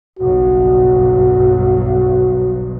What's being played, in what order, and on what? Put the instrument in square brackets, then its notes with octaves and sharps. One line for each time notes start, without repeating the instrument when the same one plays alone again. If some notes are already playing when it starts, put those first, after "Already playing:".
[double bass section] F#1 B1 G2 [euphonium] F#4